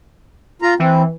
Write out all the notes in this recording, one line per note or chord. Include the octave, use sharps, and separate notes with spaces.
F4 A#5
E3 C4